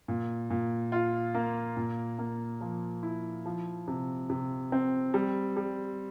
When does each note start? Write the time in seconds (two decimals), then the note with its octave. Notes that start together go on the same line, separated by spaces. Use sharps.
0.08 A#2
0.50 A#2
0.92 F4
1.35 A#3
1.77 A#2
2.19 A#3
2.61 F3
3.03 E4
3.46 F3
3.88 C3
4.30 C3
4.72 C4
5.14 G3
5.57 G3